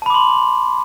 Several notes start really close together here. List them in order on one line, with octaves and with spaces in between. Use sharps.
A5 B5 D6 C6